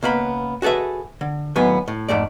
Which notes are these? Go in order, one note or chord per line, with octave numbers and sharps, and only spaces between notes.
C#2 A#3 B3 B5
F#4 G#4 A4 B4 E5
D3
D#2 A2 F#3 B3 G#5
A2
F2 G#2 A3 D5